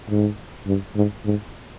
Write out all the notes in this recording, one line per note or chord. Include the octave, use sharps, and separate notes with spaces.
G#2
G2
G#2
G#2